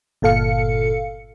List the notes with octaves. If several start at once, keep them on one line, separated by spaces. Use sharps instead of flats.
G1 A#2 A4 F5 C#7